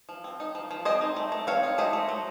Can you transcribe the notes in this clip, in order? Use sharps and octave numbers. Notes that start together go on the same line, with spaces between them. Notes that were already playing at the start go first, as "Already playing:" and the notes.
F3
C4
D#4
F3
F3
C4 C5 D#5
D#4
A3
A3
C4 C#5 F5
D#4
A3 C5 D#5
A3
F#3